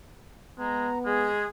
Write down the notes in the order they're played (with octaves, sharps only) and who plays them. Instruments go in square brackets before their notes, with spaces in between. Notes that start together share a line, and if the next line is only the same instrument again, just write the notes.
[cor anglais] G#3 [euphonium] B3 [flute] A#5
[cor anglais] G#3 [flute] G#4